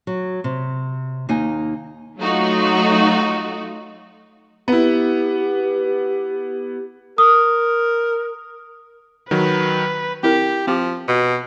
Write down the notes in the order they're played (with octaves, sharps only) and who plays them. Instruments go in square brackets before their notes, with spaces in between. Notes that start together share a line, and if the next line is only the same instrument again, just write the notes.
[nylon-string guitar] F#3
C3
D#2 A#3 D#4 G#5
[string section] F#3 A3 D#4 F4 F#4
[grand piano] B3 E4 [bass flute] G4
[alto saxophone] A#4 [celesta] D#6
[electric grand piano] D#3 F#3 [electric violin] B4
[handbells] C4 E4 A#4 [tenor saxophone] G4
[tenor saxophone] F3 [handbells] C4 G4
[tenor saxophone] B2